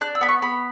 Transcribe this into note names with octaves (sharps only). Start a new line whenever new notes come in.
D4 F#6
E6
B3 B5
C#6
B3 B5